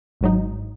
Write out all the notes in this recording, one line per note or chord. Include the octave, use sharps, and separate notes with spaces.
G#1 G#2 F#3 D#4